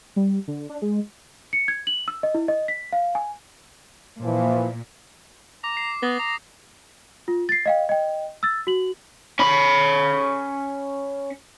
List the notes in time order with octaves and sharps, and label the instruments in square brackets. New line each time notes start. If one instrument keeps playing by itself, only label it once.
[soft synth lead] G3
D3
D4
G#3
[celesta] C#7
G#6
F#7
E6
D#5
E4
D#5
B6
F5
G#5
[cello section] A#2 [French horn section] E3 F3
[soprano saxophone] A#5 [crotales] D6
[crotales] C7
[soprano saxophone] B3 [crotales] D#6 A#6
[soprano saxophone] A#5
[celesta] F4
A6 C7
D#5 F5 G5
D#5 G5
E6 A6
F#4 F#7
[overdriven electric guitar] C#4 B5